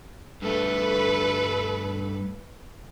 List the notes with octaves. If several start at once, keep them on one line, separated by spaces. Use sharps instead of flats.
G2 A3 A4 B4